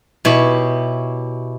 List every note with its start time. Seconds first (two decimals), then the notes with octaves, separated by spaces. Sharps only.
0.25 B2 E4 G4 C#5